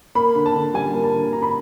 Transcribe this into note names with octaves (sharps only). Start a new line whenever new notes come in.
A#3 B5
D3
A5
D3
G3 G#5
A#3
A5
D3
D3 A#5
B5